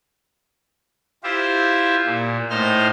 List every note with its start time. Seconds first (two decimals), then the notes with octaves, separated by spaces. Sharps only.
1.24 E4 F4 G4 C5 E5
2.06 A#2
2.50 A2 D#4 C5 C6 F6